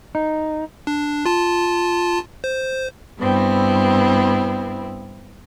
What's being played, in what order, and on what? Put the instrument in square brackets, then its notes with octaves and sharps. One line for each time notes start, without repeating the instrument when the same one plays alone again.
[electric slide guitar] D#4
[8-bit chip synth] D4
F4 A5
C5
[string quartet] G2 B3 C4 E4